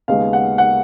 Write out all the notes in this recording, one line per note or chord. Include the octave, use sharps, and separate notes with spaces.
D#2 C#3 G#3 B3 F5
F#5
F#5